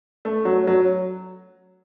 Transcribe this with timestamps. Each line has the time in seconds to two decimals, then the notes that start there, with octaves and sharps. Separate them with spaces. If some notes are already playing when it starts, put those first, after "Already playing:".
0.25 A3
0.45 F#3
0.67 F#3